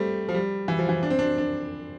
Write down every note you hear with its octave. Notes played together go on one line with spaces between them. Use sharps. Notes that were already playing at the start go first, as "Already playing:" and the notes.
Already playing: G3 A3 C4
F3
G3
E3
F3
E3
D4
C4
D4
D4